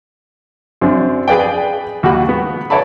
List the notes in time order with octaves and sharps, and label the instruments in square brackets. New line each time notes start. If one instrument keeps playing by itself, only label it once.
[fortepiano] F#2 C4 D4
G#4 B4 D5 G5
D#2 F#4 F#5 B5
B3
B4 C#5 D5 E5 A5 B5